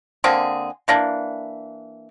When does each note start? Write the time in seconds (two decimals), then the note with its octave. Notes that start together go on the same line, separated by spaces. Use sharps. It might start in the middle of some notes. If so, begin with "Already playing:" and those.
0.24 D3 A#3 C4 G#4
0.88 E3 A#3 D4